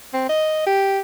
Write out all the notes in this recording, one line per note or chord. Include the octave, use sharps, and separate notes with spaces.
C4
D#5
G4